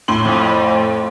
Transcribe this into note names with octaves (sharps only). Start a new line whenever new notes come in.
A2 C6 F#7
F2